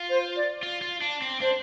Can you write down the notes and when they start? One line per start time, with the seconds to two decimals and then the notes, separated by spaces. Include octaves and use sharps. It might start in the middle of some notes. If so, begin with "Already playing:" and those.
Already playing: F4
0.09 C5
0.36 D5
0.63 F4
0.81 F4
1.01 D4
1.22 C4
1.41 D4 C5